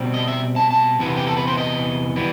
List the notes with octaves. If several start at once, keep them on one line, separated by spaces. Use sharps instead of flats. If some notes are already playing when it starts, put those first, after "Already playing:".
Already playing: B2 G3 C4
D#5
E5
A5
A5
E2 C3 E3 B3
G4
A4
B4
C5
D#5
E3 G3 B3